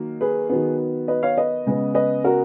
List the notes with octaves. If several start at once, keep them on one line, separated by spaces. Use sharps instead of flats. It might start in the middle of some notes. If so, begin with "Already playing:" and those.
Already playing: D#3 F#3 A#3
G#4 B4
D#3 F#3 B3
B4 D#5
C#5 F5
B4 D#5
C#3 G#3 B3
B4 D#5
F#4 A#4